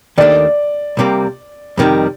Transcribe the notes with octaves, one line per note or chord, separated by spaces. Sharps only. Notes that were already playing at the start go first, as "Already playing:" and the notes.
D#2 D#3 A3 D4 D5
C2 C3 G3 A#3
F2 C3 D#3 G3